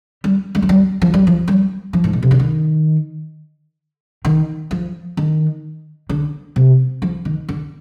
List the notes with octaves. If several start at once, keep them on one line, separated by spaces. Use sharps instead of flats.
G3
G3
F3
G3
F3
G3
F3
G3
F3
G#2
A#2
C3
D3
D#3
D#3
F3
D#3
D3
C3
F3
D#3
D3